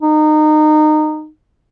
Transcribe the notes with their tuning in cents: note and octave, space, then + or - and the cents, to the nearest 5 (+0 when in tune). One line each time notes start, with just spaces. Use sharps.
D#4 -25